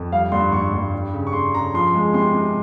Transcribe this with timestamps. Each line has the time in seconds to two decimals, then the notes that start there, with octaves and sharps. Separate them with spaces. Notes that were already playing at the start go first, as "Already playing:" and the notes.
Already playing: F2
0.12 G3 F5
0.32 G2 C6
0.52 G2 C#6
0.73 G2
0.94 G3
1.13 C#3
1.27 C#6
1.33 C#3 C6
1.54 C#3 A#5
1.74 F3 C6
1.94 G#3
2.14 C3 C6
2.35 C3